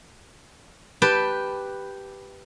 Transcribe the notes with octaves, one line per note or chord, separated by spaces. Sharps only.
G4 B4 G5 A5